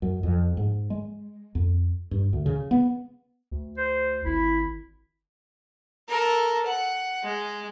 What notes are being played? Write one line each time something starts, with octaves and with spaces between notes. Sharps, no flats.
F#2
F2
G#2
G#3
F2
G2
D2
C#3
B3
D2
C5
G#1 E4
A4 A#4
F#5
G#3